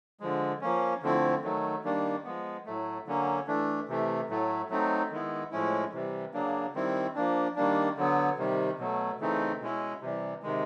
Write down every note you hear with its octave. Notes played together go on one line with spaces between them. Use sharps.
D3 F3 G#3
F3 A#3 C#4
D3 F3 A3 C4 E4
D#3 F#3 A3
D#3 G3 A#3 D4
F3 G#3 B3
A2 F#3 A3
D3 F#3 A#3 C#4
E3 A3 D4
C3 E3 A3
A2 F#3 A3
F#3 A3 C4 D#4
D#3 G#3 B3 E4
A2 F3 G#3 C#4 E4
C3 E3 G3
C#3 F#3 A#3 D4
D#3 G3 C4 E4
F3 A#3 D4
D#3 G3 A#3 D4
D3 F#3 B3
C3 D#3 G3
B2 F#3 A3
C#3 E3 A3 C4 D#4
B2 G#3 C#4 E4
C3 E3 G3
C3 D#3 G#3